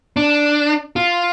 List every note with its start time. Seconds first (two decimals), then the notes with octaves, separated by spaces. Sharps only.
0.17 D4
0.96 F4